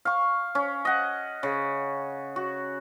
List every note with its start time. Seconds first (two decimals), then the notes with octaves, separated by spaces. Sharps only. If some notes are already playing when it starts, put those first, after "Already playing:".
0.05 F5 C#6
0.55 C#4
0.85 D#5 F#5
1.43 C#3
2.36 F#4